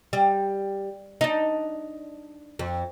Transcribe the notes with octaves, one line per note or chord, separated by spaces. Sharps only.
G3
D4 D#4
F2